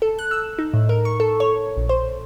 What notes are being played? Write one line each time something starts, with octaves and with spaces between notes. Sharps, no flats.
A4
F#6
E6
D#4
A2
A#4
C#6
A4
C#5
A#1
C5